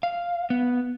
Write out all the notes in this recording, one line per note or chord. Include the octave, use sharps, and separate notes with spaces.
F5
B3